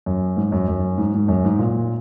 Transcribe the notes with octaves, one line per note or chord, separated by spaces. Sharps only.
F#2
G#2
F#2
F#2
G#2
G#2
F#2
G#2
A#2